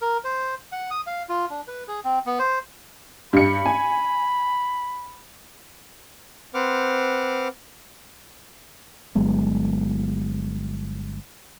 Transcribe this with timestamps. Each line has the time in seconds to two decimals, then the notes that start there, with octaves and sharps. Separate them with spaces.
0.01 A#4
0.24 C5
0.72 F#5
0.91 D#6
1.06 F5
1.29 F4
1.50 D4
1.68 B4
1.88 G#4
2.05 C4
2.26 B3
2.39 C5
3.33 G2 B5 C#7
3.66 G#5
6.54 C4 B4 C5 F#5 D6 F6
9.15 G1 F#3 G#3 B3